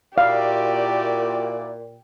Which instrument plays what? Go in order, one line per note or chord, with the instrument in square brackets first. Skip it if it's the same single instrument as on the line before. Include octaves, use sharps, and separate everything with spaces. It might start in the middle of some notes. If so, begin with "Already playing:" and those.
[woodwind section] A#2 [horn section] E4 F#4 D5 [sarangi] G4 [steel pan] F5